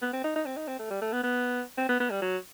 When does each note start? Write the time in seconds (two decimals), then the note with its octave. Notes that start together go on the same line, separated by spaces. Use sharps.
0.02 B3
0.13 C4
0.24 D#4
0.35 D#4
0.46 C4
0.57 D#4
0.68 C4
0.79 A3
0.90 G3
1.01 A3
1.12 B3
1.23 B3
1.78 C4
1.89 B3
2.00 B3
2.10 G3
2.22 F#3